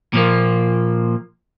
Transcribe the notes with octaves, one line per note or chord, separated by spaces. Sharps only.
A#2 F3 A#3